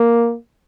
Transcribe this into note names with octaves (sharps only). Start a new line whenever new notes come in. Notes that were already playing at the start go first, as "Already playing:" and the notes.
Already playing: A#3